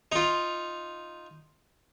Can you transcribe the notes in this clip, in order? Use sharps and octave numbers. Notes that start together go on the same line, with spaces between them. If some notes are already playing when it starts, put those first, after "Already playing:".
D#4 F4